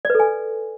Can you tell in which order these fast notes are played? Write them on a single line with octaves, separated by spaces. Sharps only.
D5 B4 A4 G#5